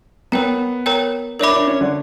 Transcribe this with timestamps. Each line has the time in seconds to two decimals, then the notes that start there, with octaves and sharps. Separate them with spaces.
0.32 B3 A#4 C#5 G5 A#5
0.86 A#4 C#5 G5 A#5
1.39 D4 A#4 C#5 E5 B5 D6
1.54 D4
1.67 C#4
1.81 D3